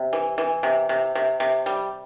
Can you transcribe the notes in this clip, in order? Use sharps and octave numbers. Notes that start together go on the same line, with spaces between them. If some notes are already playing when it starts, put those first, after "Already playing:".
Already playing: C3
E3
E3
C3
C3
C3
C3
G3